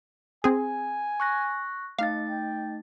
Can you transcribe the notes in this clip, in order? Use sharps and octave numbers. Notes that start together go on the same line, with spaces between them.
C4 G#4 G#5
C#6 F#6 A#6
A3 D#4 F5 A6
G5